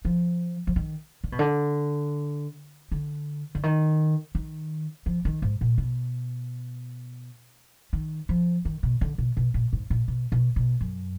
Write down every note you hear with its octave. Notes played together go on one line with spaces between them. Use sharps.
F3
F3
D#3
D3
B2
D3
D3
D3
D#3
D#3
F3
D#3
G#2
A#2
B2
D#3
F3
D#3
B2
D3
B2
B2
A#2
G#2
A#2
B2
B2
B2
F#2